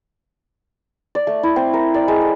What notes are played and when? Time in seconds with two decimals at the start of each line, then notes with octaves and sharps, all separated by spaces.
1.15 D5
1.27 A3
1.43 E4
1.56 C4
1.73 A#4
1.94 D5
2.08 G#3
2.21 A4